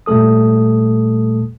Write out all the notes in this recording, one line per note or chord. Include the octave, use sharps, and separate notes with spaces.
A#2 G3 A3 A4 D#6